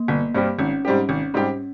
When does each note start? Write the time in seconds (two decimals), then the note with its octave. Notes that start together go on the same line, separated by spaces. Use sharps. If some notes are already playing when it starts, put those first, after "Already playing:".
Already playing: A#3
0.08 G1
0.35 G2 G3 C4 G4
0.59 G#1 C#4
0.85 G#2 G3 C4 G4
1.09 G#1
1.34 G#2 G3 C4 G4